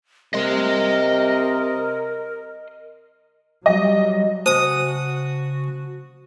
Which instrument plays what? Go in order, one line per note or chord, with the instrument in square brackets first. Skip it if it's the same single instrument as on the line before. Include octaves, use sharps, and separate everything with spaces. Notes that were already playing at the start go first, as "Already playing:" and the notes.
[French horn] C3 [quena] A#4 [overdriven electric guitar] D#5 C6
[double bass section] F#3 G3 [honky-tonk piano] D#5
[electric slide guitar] C#3 G#5 A5 [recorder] F#4 [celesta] C5 [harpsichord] D#6